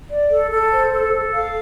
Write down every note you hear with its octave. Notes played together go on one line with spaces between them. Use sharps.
D5
A4
A4
C5
A4
A4
F5